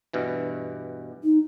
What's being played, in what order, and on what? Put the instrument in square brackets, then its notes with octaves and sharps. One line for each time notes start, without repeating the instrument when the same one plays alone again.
[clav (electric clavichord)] G2 B2 E3
[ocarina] D#4